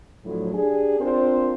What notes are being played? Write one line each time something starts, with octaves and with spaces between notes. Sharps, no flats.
A2 D3 F3 F#3
D4 G4 G#4
C4 D4 F4 A#4 C5